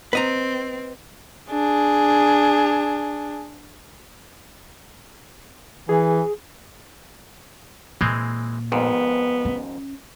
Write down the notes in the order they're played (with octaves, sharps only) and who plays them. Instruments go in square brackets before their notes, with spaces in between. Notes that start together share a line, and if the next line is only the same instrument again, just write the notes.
[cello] C4 [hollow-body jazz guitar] B4 D#5 A#5
[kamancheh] D4 G#4
[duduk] E3 [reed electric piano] G#4
[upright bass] A#2 [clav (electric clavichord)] E3 G#3 C4
[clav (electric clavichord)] G#1 F2 G#2 [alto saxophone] B3
[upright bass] C#4